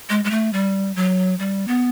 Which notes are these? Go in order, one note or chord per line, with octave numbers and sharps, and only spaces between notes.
G#3
G#3
A3
G3
F#3
G3
B3